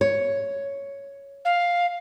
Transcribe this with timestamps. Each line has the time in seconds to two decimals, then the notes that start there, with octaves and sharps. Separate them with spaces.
0.01 C#5
1.45 F5